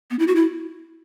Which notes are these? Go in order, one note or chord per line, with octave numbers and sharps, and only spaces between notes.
B3
E4
F#4
E4